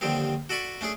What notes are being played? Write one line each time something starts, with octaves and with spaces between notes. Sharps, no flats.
D#2 D3 D#3 F3 G3 C4
F#4 A4 D5 B5 C#6
A3 C#4 D4 G#4